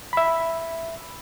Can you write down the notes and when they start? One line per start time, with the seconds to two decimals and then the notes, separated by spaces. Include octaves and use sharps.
0.13 E5 B5